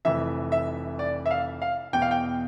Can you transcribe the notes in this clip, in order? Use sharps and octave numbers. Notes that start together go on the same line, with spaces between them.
F1 F2 E3 E5
E5
D5
E5
F5
F5
E2 B2 G5
F5
G5